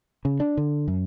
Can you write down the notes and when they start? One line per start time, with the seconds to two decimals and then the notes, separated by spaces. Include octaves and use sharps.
0.25 C#3
0.40 D4
0.57 D3
0.88 F#2